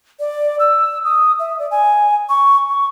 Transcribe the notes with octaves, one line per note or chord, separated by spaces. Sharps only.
D5
E6
D#6
E5
D5
G#5
C#6
C#6